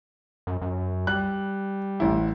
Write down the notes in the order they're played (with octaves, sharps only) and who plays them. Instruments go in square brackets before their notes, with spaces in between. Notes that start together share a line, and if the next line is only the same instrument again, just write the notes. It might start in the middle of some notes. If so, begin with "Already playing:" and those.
[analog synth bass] F#2
F#2
[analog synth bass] G3 [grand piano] F#6
[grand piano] A1 E4